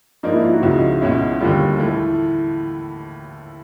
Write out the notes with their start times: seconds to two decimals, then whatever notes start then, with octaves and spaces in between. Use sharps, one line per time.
0.23 G#2 F3 A#3 D4 D#4
0.33 E4
0.43 F4
0.53 F#4
0.63 C#2 C#3 F3
1.01 C#2 B2 G#3 C#4 E4
1.40 D#2 D3 G3 F4
1.79 A2 E3 A3